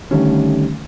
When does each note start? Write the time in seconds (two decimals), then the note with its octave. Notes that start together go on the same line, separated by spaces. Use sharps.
0.11 D3 D#3 G3 A3 C#4